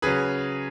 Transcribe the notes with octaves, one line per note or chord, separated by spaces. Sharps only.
C#3 F#3 G#4 B4